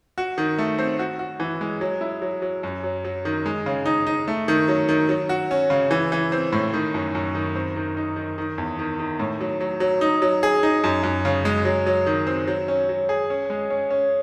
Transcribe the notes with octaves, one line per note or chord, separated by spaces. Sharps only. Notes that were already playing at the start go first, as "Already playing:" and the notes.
F#4
D#3
A3
C4
F#4
F#4
E3
G#3
F#3
E4
F#3
F#3
F#2
F#3
F#3
D#3
G#3
C#3
D#4
D#4
A3
D#3
F#3
D#3
F#3
F#4
C#4
C#3
E3
E3
C4
A2
D#3
F#2
F#2
D#3
C4
D#3
D#4
D#3
D#3
E2
D#3
D#3
A2
F#3
F#3
F#3
D#4
F#3
G#4
D#4
F#2
F#2
C#3
G#3
F#3
F#3
D#3
C4
F#3
C#4
F#3
G#4
C#4
G#3
C#4
C#4